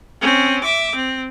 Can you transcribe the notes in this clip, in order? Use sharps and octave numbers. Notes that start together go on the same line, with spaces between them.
C4 C#4
E5 D6
C4